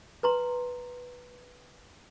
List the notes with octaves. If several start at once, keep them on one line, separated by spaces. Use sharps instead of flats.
B4 A#5 C6